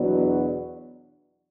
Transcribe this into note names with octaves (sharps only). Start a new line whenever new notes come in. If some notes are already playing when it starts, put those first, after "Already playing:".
Already playing: E2 B2 F#3 B3 D4